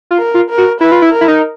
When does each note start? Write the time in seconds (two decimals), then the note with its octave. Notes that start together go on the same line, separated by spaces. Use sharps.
0.11 F4
0.19 A#4
0.34 F4
0.50 A#4
0.58 F#4
0.81 E4 B4
0.92 F4
1.02 E4
1.12 A#4
1.21 E4
1.28 D#4